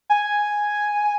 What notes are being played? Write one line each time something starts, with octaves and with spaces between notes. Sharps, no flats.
G#5